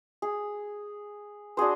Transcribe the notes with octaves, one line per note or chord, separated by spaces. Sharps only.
G#4
D4 F#4 G#4 C5